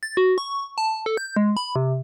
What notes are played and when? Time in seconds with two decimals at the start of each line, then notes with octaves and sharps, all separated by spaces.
0.03 A6
0.17 F#4
0.38 C#6
0.78 A5
1.06 A4
1.17 G6
1.37 G#3
1.57 B5
1.76 C3